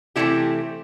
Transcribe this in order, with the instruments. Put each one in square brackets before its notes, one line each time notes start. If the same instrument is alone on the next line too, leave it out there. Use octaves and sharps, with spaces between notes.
[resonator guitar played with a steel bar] C3 E3 A3 E4 G4